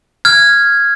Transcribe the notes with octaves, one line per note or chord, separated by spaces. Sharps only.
F6 G#6